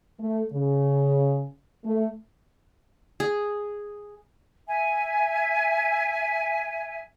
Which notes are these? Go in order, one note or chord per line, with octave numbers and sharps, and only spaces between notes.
A3
C#3
A3
G#4
E5 G#5